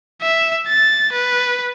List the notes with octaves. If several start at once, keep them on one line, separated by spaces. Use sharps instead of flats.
E5
A6
B4